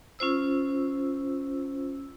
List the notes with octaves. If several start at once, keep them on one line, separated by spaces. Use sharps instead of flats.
C#4 F4 C5 E6